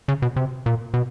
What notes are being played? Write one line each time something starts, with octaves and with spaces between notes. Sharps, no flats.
C#3
B2
C3
A#2
B2